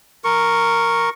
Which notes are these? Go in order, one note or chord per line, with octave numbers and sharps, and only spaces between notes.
A#4 C#6